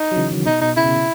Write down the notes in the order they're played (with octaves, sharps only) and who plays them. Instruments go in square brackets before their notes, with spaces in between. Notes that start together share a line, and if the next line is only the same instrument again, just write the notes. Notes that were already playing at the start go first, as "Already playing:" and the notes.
Already playing: [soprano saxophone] D#4
[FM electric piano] F#3
C#3 E3
D#3 F#3
[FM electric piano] B2 [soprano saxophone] D#4
[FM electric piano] B2 [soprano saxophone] D#4
[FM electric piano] C#3 [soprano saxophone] E4
[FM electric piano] B2
C#3